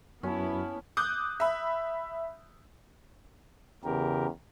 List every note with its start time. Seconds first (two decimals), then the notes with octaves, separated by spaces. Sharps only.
0.23 F#2 B3 C#4 E4 F#4 A5
0.97 D6 D#6 F#6 G6
1.40 E5 B5
3.84 E2 C#3 G4 A#4